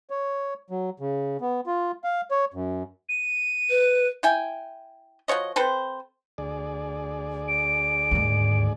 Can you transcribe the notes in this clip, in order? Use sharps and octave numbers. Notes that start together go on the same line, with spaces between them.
C#5
F#3
C#3
B3
F4
F5
C#5
F#2
D#7
B4
E4 G5 G#5
F3 F#4 C#5 D#5
C4 A4 B4 C5
D2 G#4 D5
D7
D#2 G#2